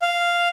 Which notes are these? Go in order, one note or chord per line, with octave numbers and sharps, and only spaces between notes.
F5